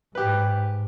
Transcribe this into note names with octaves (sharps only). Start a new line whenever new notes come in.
G#2 G4 B4